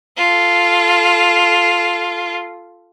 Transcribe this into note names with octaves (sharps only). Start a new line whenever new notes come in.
F4 A4